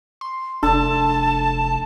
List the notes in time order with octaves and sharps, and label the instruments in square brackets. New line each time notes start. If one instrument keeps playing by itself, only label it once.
[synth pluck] C6
[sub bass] F1 [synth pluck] D4 [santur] A4 E5 [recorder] A5